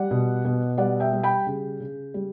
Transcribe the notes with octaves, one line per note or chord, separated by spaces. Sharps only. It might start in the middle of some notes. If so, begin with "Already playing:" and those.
Already playing: G3 D5 F#5
B2
B2
G3 D5 F#5
E5 G5
G3
G5 B5
C#3
C#3
G3